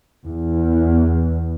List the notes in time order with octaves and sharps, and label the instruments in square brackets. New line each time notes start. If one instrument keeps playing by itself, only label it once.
[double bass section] E2